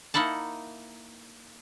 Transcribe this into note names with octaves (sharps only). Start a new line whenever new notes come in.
A#3 D#4 E4 F#5 A5